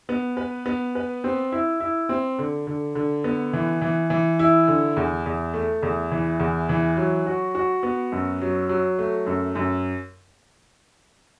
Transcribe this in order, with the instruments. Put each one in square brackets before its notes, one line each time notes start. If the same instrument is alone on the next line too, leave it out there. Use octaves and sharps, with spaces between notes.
[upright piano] B3
B4
B3
B4
C4
E4
E4
C4
D3
D3
D3
B3
E3
E3
E3
E4
D3
E2
E2
A3
E2
E3
E2
E3
F#3
F#4
F#4
B3
F#2
F#3
F#3
A3
F#2
F#2